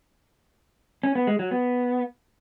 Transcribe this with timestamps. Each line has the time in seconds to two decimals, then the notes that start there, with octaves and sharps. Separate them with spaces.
1.03 C#4
1.15 B3
1.27 G#3
1.39 F#3
1.51 B3